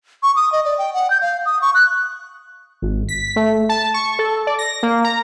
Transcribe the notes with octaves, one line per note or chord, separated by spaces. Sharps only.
C#6
D#6
D#5
D5
G5
F#5
G6
F5
D#6
C#6
F#6
G#1
B6
A3
A5
C#6
A4
D5
A#6
A#3
A#5